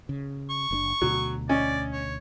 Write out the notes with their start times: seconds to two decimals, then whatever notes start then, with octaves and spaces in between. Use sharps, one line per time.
0.09 C#3
0.50 C#6
0.71 F#1 C#3 D4
1.01 D2 B2 F#3
1.49 C#4 D5 D#5
1.93 C#5